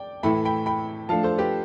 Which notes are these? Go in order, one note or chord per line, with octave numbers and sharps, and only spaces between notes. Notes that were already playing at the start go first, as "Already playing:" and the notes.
Already playing: D5 G5
A2 E3 A3 E4 G5 B5
G5 B5
G5 B5
F3 A3 D4 F5 A5
A4 C5
G4 B4